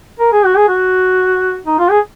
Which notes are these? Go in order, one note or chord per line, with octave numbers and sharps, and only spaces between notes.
A#4
G#4
F#4
G#4
F#4
D#4
F4
G#4